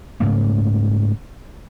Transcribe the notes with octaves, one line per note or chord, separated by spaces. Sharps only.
G#2 C#3 A3 A#3